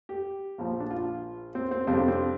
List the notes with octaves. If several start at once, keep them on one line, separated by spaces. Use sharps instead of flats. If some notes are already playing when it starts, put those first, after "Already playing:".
G4
A#1 A#2 F3
D4
F4
C4
C4
F2 C3 G3 C4
D4
C4